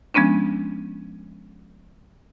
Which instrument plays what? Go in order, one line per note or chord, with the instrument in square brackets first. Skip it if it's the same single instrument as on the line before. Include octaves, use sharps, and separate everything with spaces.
[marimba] F3 G#3 B3 C#4 D4